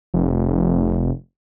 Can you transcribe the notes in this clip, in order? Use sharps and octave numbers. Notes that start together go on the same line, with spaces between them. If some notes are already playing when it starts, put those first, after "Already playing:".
F1